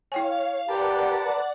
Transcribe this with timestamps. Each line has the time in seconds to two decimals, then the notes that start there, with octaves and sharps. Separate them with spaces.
0.12 E4 C#5 F5 G5 G#5
0.69 G4 A#4 B4 D5 F#5 A5